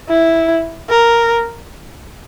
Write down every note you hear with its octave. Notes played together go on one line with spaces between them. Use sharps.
E4
A#4